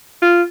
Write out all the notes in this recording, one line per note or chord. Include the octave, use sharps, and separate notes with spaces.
F4